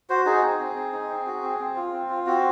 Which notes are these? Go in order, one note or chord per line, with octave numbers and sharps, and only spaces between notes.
F#4 C5
D#4 G#4
C4
C4
C4
D#4
C4
F#4
C4
C4
F4
C4
F4
C4 F#4